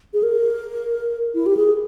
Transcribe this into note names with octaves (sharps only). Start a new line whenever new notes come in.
G#4
A#4
E4
G4
G#4